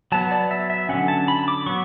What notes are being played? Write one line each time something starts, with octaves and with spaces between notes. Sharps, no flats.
F#3 B3 A5
D5
E5
E5
D3 F#3 C#4 F#5
A5
B5
D6
F#3 B3 C#6